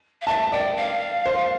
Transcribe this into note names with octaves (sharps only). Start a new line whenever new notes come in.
F5
E5 A5
D5 G5
F5
C5